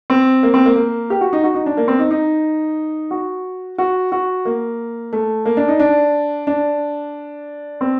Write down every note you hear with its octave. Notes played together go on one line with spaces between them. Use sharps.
C4
A#3
C4
A#3
A#3
G4
F#4
D#4
F#4
D#4
D4
A#3
C4
D#4
D#4
F#4
F#4
F#4
A#3
A3
A#3
D4
D#4
D4
D4
C4